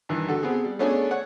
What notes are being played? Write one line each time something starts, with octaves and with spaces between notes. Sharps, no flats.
G2 D#3 E3
D3 F#4 G4 A4
B3 C4 G#4
G3
A3 B3 C#4 D4 G#4
C#5 F#5